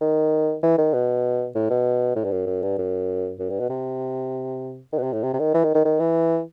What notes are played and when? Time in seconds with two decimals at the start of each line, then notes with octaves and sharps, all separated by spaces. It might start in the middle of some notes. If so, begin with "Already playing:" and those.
0.01 D#3
0.63 E3
0.78 D#3
0.94 B2
1.55 A2
1.70 B2
2.16 A2
2.24 G2
2.31 F#2
2.47 F#2
2.63 G2
2.78 F#2
3.40 F#2
3.50 G2
3.60 B2
3.70 C3
4.93 D#3
4.98 B2
5.03 C3
5.13 A2
5.23 C3
5.34 C3
5.39 D#3
5.54 E3
5.64 D#3
5.75 D#3
5.85 D#3
6.00 E3